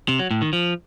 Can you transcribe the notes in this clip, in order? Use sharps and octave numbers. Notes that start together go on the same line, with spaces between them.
C3
F#3
A2
D#3
F3